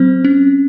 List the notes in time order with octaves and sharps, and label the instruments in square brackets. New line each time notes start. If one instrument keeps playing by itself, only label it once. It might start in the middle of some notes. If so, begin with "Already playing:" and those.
Already playing: [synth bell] F#3 C4 C5
C#4